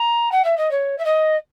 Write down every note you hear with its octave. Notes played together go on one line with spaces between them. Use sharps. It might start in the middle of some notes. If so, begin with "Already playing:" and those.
Already playing: A#5
F#5
E5
D#5
C#5
E5
D#5